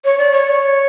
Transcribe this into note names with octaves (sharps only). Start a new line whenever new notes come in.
C#5
D5
C#5